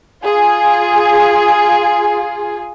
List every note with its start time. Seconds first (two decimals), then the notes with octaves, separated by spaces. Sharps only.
0.23 F4 G#4